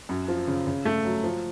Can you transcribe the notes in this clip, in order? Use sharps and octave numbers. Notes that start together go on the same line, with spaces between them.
F#2
F3
C#3
C#3
A3
F#3
F3